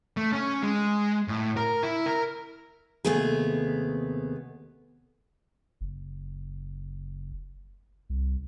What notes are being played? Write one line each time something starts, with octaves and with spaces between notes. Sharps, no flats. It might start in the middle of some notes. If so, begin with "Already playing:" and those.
A3
C#4
G#3
A2
A#4
E4
A#4
D#2 C3 A3 B3 G#4
F#1
C2